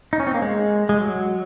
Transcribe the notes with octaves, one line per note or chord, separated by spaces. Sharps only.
D#4
C#4
C4
A#3
G#3
G#3
F#3